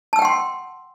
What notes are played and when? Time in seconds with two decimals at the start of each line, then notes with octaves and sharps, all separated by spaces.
0.13 A5
0.16 E6
0.19 G5
0.22 F#5
0.25 C6